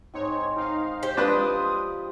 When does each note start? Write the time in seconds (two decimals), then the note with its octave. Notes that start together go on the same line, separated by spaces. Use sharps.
0.14 G#2 C4 D#4 C#5 G#5
0.56 D#4 A#4 F5
1.03 G4 C5
1.17 F3 D4 F4 B4 D#6